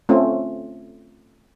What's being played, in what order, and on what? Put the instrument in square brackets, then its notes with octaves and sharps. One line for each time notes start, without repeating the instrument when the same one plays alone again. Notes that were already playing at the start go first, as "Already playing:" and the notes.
[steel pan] A3 C4 C#4 F4